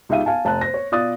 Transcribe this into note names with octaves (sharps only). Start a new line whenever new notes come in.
C#2 D#4 G4 E5 F5 D#7
F5 G#5 A5
F1 A5 A#5 F#6
C5 A#6
C#5
B2 F4 D5 D#6 F#6 A6